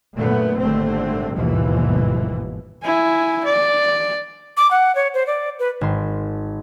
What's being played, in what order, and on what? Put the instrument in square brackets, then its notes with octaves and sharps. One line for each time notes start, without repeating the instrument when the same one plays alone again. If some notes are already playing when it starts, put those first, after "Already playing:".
[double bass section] F#2 A#2 D3 A3 B3
G#1 A#2 D3 G3 A3 C4
G1 D#2 G#2 B2 E3 F3
[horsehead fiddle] E4 G#5
D5
[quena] D6
F#5
C#5
C5
D5
B4
[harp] G#1 C6